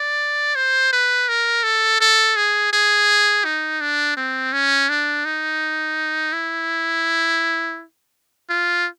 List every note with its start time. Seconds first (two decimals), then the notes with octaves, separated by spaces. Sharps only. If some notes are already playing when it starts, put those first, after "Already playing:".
Already playing: D5
0.56 C5
0.92 B4
1.28 A#4
1.64 A4
2.01 A4
2.36 G#4
2.73 G#4
3.45 D#4
3.81 D4
4.17 C4
4.53 C#4
4.89 D4
5.25 D#4
6.33 E4
8.50 F4